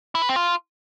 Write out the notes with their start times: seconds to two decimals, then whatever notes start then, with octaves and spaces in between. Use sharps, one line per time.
0.15 E4
0.22 B4
0.29 C4
0.36 F4